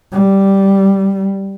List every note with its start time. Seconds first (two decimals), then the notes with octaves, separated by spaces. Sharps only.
0.12 G3